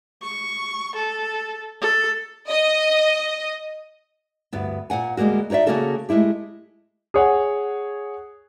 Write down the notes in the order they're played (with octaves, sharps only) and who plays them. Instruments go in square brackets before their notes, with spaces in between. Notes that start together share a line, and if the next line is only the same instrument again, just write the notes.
[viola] C#6
A4
A4
[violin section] D#5
[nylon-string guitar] D2 G2 B3
A#2 F#3 F#5 G#5
D2 G3 G#3 A#3 F#4
D#4 F#4 C#5 D5 E5
C#3 F3 A#3 C#4 F#4 A4
G#3 A3 E4 G4
[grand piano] G#4 C#5 F#5 G#5